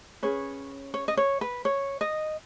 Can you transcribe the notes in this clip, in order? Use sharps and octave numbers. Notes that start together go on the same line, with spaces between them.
C#4 G#4 B4 C#5
C#5
D#5
C#5
B4
C#5
D#5